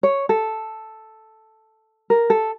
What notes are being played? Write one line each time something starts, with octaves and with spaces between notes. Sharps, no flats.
C#5
A4
A#4
A4